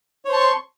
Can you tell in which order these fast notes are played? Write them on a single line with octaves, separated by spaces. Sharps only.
C#5 C5 A5 C#6 C6